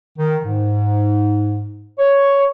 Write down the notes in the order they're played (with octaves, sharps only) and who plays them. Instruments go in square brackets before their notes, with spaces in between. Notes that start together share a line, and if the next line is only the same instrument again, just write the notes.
[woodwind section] D#3
G#2
C#5